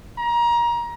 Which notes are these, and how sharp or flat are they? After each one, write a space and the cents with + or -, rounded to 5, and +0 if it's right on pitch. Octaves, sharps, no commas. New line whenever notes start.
A#5 +25